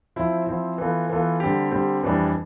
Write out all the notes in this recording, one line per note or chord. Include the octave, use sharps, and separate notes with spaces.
F3 C4 E4
F3 C4 E4
E3 B3 F4 A4
E3 B3 F4 A4
D3 G3 C4 G4
D3 G3 C4 G4
F2 E3 G3 D4